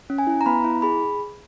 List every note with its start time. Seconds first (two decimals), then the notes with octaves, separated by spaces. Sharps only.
0.10 C#4
0.18 G#5
0.27 E4
0.41 A#5
0.46 B3 B5
0.64 E4
0.82 G#4 B5